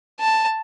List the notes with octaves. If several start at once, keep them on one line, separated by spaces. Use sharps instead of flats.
A5